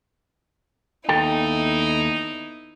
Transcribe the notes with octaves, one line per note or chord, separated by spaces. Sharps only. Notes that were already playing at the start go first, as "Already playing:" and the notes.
D#2 B3 D#4 E4 A4 G5